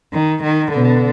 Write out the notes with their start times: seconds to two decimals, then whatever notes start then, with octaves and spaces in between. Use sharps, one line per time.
0.13 D#3
0.44 D#3
0.73 B2 D3 B3